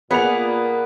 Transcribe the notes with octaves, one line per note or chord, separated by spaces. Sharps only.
A#2 A#3 B3 G#4 F#5 F7